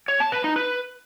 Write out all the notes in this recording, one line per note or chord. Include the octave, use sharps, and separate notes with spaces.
C#5
A5
B4
D#4
B4